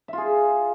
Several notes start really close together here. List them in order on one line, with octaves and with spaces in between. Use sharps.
E5 F4 G#4